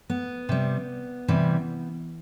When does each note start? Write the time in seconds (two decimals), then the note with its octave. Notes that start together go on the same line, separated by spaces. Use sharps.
0.10 B3
0.49 C3 G3
1.28 C3 E3 G3